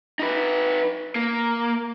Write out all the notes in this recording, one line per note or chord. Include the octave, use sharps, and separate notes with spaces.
D#4 B4
A#3